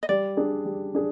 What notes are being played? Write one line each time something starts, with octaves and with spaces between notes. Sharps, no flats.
D#5
G3 D5
D4 G#4
G3
D4 G#4